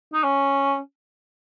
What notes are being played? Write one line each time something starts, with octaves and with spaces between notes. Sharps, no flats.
D#4
C#4